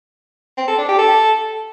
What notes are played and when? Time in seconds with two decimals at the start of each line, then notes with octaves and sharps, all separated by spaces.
0.57 C4
0.68 A4
0.78 D4
0.88 G4
0.99 A4